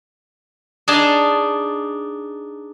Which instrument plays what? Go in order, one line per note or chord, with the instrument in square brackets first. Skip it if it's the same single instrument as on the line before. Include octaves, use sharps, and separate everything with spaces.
[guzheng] D4 D#4 G#4 A5